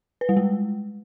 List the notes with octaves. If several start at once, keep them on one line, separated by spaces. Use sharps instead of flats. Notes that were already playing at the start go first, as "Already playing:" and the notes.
B4
G3
G#3